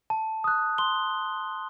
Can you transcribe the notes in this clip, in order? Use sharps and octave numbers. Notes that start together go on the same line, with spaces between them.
A5
D#6 F#6
C6 G7